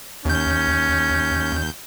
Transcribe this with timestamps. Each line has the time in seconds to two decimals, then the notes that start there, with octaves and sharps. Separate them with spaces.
0.25 D#2 C#4 G6